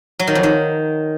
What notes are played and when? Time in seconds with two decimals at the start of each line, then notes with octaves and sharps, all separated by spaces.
0.19 F#3
0.27 D#3
0.35 F2
0.43 D#3